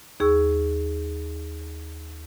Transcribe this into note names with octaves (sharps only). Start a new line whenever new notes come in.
D#2 G#4 C#6 E6